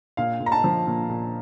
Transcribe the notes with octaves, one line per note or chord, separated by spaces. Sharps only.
A#2 F5
A#2
A#5
A5
F3
A#2
A#2